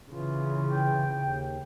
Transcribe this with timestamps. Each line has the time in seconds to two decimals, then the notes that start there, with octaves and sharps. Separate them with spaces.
0.12 C#3 E3 F4
0.70 G5
1.19 D#2